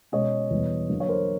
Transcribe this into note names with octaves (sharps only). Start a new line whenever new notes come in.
B2 G#3 C#4 C#5 D#5
E2 B2 G3 B3
D3 F#3 A#3
C#5
A#4 C5